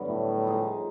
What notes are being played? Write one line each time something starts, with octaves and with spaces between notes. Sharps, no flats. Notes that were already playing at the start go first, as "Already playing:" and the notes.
Already playing: G2 D3 F#3 B3
A2
F3 A#3 D#4 G#4